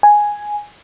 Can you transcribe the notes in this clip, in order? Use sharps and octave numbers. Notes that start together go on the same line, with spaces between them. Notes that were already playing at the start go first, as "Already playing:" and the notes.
G#5